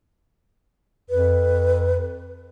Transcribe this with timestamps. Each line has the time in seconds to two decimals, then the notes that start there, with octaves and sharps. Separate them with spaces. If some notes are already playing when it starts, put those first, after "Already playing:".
1.10 F2 B4